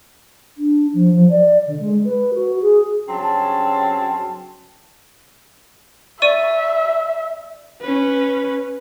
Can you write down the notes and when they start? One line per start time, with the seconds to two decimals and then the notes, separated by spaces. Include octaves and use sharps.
0.57 D4
0.93 F3
1.12 F3
1.30 D5
1.67 D3
1.79 G#3
2.05 B4
2.34 F#4
2.61 G#4
3.08 G2 C#3 F#3 C4 C#4 A5
6.22 D5 E5 C#6 D#7
7.81 C#4 B4